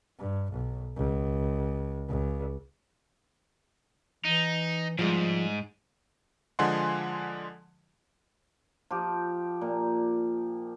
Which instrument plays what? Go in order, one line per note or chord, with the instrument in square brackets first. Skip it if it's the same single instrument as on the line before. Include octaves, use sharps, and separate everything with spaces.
[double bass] G2
B1
C#2
C#2
[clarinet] E3 [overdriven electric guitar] D#4
[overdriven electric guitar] G#2 [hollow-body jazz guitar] F3 G#3 [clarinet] G3
[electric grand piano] D3 F3 G#3 F#5 G#5 C6
[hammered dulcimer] F3 G4
A#2